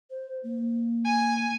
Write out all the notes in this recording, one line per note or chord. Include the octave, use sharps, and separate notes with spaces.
C5
A#3
G#5